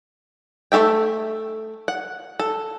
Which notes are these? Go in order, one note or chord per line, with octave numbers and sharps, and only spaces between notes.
A3 F4 A4 E5 G5
F#5
A4